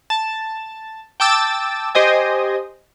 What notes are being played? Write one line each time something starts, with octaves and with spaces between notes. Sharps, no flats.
A5
G5 A5 D6 E6 A6
G4 C5 D#5 G#5